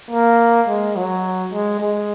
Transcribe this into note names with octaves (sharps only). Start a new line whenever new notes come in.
A#3
G#3
F#3
G#3
G#3